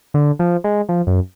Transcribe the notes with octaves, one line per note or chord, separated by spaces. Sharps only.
D3
F3
G#3
F3
F#2